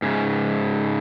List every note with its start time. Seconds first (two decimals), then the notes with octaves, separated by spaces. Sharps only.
0.02 G#2 C#3